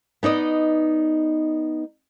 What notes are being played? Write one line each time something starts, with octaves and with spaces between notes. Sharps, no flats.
B3 D#4 D5 D#5